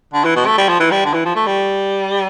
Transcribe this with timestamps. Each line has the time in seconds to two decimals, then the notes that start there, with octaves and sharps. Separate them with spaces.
0.13 D3
0.24 E3
0.36 B2
0.46 A3
0.58 G3
0.69 F3
0.80 E3
0.91 G3
1.05 D3
1.13 E3
1.25 F3
1.36 A3
1.46 G3